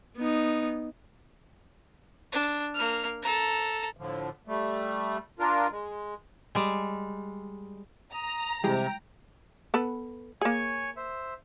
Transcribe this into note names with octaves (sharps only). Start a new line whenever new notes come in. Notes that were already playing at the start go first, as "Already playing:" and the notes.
B3 D#4
D4
A#3 F6
A4 A#5
A2 D3 F3
G3 A3
D4 F4 A#4
G#3
G3 G#3
A#5 D#6
C3 E3 G3 G#3 G5
B3 A4 B4
A#3 G#4 C#5 G#5 C#6
C5 E5